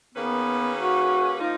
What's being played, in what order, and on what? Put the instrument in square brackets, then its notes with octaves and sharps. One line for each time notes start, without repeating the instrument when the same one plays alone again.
[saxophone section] D#3 A#3 C#4 G#4 B4 [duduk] B3
[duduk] F#4
[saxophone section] F3 A#3 D#4 [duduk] F4